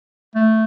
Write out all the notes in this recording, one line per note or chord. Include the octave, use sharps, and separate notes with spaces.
A3